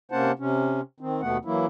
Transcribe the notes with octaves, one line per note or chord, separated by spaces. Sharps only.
C3 A#3 C#4 C5 F#5 A5
C3 C#4
D#3 C4
D#2 B2 A3 B3 F#5
E3 F#3 A#3 E4